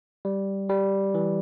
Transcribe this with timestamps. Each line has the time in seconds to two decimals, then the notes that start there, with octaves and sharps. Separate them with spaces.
0.25 G3
0.70 G3
1.14 E3